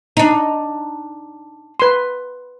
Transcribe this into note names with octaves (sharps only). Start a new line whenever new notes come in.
D4 D#4
B4 C6